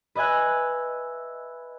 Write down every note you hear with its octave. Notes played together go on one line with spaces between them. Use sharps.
B4 D#5 E5 G#5 F#6